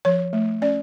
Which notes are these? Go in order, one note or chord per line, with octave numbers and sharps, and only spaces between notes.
F3 C#5
A3
C#4 D5